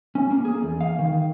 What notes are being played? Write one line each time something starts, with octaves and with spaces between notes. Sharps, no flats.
C#4
A#3
G#4
E2
F5
D#3